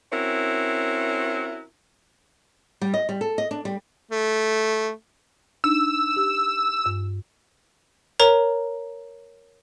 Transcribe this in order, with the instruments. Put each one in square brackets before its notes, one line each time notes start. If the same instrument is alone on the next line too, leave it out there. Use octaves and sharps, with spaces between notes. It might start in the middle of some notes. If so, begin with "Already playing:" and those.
[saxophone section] C4 C#4 E4 F#4 A#4
[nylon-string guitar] G3
D#5
G3
A4
D#5
D4
G3
[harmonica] A3
[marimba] D4 D#4 [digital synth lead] E6
[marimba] G4
G2
[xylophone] A#4 C#5 A#5